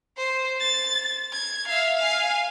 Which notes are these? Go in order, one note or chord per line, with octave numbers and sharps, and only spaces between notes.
C5
A6
G#6
E5 F5
F5 G#5